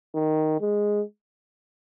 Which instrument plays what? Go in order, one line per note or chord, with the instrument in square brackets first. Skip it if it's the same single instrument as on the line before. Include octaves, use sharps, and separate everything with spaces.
[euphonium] D#3
G#3